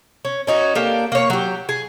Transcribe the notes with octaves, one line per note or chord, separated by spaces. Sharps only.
C#4
C#4 D#4 F#4
A#3 D4 G4 A4
A#3 C#5
F#3 G4
G#4